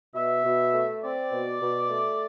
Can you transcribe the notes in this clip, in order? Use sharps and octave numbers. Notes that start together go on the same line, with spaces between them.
B2 E5
B2
A3
C4 D5
B2
B2
A3